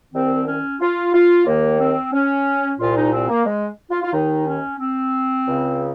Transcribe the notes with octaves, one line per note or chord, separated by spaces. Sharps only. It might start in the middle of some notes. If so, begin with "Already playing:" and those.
C2 C3 D#3 C4
C#4
F4
F4
D#2 D#3 A#3
C4
C#4
C2 A#2 F4
D#4
C4
A#3
G#3
F4
F4
D#2 D#3 D#4
C#4
C4
C#2 C#3